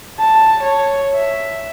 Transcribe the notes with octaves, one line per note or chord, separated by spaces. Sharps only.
A5
C#5
E5